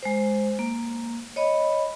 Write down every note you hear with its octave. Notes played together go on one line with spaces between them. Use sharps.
G#3 C5
A#3
C#5 D#5 B5